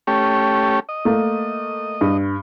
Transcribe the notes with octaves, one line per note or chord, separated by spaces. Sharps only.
A3 C#4 G4
D#5
A3 A#3
G2